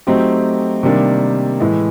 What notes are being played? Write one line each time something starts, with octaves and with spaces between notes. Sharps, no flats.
F#3 A3 C4 D#4 G4
C3 D#3 G3 A#3 D4
A2 E3 G#3